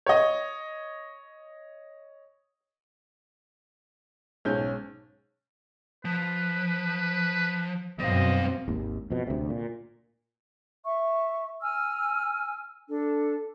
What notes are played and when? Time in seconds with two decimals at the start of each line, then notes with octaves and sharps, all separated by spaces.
0.06 C#5 D#5
4.45 B1 G#2 C#4 G6
6.05 F3 B4
8.00 F#2 B2 G3 C4 D#5 F5
8.68 G#1 D#2
9.10 F2 B2
9.27 D2 C3
9.50 A#2
10.84 E5 C#6
11.61 G#5 E6 F6
12.88 D4 A4